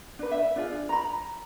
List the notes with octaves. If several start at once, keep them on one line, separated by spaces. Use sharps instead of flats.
D4 B4
E5
D4 F4 G#4
A#5 B5